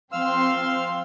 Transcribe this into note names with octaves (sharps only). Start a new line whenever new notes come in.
F3 C4 F5 C6 E6 F6